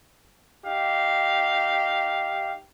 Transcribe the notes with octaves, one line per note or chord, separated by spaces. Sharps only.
D#4 G4 F5